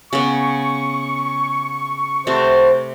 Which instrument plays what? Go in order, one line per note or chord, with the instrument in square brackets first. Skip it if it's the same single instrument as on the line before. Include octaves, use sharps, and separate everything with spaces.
[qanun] C#3 B3 [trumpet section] C#6
[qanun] C3 A3 [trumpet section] F#4 A5 C#6 [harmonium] C5